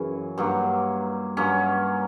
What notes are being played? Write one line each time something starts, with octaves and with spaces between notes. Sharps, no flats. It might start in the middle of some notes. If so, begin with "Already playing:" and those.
Already playing: F#2 C#3 E3
G2 F#3 A#3
G2 F#3 A#3 C#4